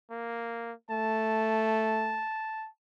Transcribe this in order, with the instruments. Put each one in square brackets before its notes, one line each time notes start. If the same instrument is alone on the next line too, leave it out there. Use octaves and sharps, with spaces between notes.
[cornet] A#3
[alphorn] A3 [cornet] A5